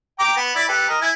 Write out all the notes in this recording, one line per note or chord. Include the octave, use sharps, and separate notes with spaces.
G5 A#5 D6
B3 B5
E4 D5 B5
G4 A4 B4
A#4 D#5
E4 G#5